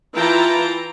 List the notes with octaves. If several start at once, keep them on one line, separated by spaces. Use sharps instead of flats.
E3 E4 F4 G5 A5 A#5